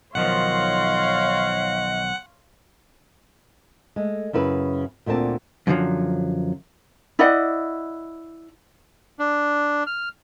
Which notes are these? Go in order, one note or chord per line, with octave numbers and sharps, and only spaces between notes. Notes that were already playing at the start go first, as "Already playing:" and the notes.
B1 D#3 F3 C#5 D#5 F5 F#5 C6
G#3 A3
F#2 C#3 E4 B4
D2 A#2 D3 C4 A5
F#2 A#2 D3 D#3 F3 F#3
E4 D5 D#5 F#5
D4
F6